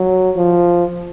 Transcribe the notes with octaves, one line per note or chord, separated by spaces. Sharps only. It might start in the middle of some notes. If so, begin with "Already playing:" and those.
Already playing: F#3
F3